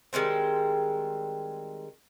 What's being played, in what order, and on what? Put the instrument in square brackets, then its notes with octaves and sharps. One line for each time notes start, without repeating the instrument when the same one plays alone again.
[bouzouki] D#3 G3 G#3 C4